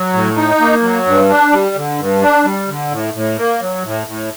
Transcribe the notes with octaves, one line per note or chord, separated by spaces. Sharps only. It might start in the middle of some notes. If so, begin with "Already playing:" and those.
Already playing: F#3
A2
D#4
A#3
F#3
G2
D4
G3
D3
G2
D4
G3
D3
A2
A2
A#3
F#3
A2
A2